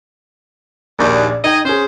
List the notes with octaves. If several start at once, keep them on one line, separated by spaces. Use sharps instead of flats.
A#1 D#2 A#2
D#4 G#4 D#5 G5
C#4 G#4 C5